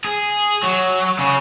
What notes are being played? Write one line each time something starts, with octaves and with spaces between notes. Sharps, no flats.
G#4
F#3
C#3